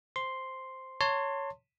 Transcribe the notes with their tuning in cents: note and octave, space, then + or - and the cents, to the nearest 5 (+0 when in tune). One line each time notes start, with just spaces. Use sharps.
C5 +0 C6 +0
C#5 +0 A5 +35 C6 +5